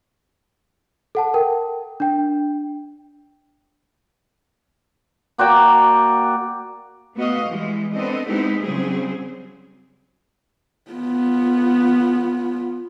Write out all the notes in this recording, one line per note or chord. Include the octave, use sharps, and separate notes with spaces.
A4 F#5 A5
A#4 G5
D4 G5
A#3 F#4 D5 G5
A3 B3 F#4 D#5 F5
E3 G3 G#3
B3 C4 D4 A4 D#5
G#3 B3 C4 D#4 E4 G4
C#3 F#3 G3 C4 G#4
B3 F4